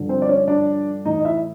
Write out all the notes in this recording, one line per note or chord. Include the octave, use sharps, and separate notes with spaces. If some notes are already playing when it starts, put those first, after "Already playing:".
Already playing: G2 D3 F3
C4 C5
D5
C#4 C#5
D4 D5
A2 E3 D#4 D#5
D#5
E4 E5